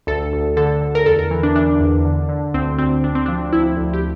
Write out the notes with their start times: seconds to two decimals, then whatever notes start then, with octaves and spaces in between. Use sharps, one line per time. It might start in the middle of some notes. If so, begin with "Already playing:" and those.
0.07 D2 A4
0.32 D2
0.57 D3 A4
0.82 D3
0.95 A#4
1.06 E2 A4
1.19 A#4
1.31 E3
1.43 D4
1.56 E3 D4
1.80 E2
2.05 D3
2.29 D3
2.54 D2 C4
2.78 D2 C4
3.03 D2 D4
3.15 C4
3.26 F3 D4
3.52 D2 E4
3.77 D2
3.93 G4